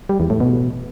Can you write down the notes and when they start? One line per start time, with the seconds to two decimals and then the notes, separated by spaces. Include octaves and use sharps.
0.09 G3
0.20 E2
0.30 A2
0.40 B2